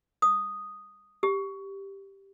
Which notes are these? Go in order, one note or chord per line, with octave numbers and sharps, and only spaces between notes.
D#6
G4